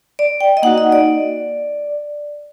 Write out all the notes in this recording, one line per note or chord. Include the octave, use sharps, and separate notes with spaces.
D5
G5
D#5
A#3 D#4 F#4 F#5
D#5
D5